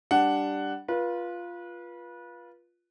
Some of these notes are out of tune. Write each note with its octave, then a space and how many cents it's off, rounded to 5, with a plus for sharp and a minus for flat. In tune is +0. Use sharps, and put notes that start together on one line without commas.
G3 +0 D4 +0 F#5 +5
F4 +0 B4 -30